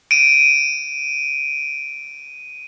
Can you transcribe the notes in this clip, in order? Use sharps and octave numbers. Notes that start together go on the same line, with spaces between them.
D7 D#7